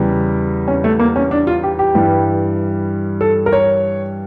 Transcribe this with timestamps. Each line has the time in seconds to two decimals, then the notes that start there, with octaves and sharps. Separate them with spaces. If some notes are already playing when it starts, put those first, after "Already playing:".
Already playing: E2 C#3 E3 G3
0.68 C#4
0.84 A3
0.99 A#3
1.16 C#4
1.31 D4
1.47 F4
1.63 G4
1.79 G4
1.95 G2 E3 G3
3.21 A4
3.46 A#4
3.53 C#5